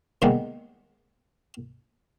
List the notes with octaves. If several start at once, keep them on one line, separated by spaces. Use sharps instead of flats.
C3 D#3 G3 G#3 A#3 B3